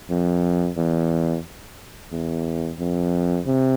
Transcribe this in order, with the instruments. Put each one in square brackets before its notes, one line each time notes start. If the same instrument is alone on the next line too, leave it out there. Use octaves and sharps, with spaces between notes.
[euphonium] F2
E2
E2
F2
C3